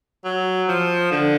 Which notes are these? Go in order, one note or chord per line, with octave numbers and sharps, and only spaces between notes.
F#3
F3
D3